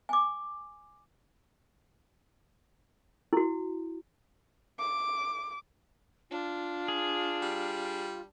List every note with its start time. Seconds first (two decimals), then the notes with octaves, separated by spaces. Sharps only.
0.09 G#5 D6
3.33 E4 F#4
4.80 D6
6.30 D4 F4
6.88 G#4
7.42 G3